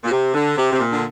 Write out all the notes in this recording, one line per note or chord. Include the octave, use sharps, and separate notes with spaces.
A#2
C3
D3
C3
C3
A#2
D3